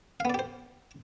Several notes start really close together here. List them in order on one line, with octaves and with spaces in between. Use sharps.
F5 B3 D5 G4 C5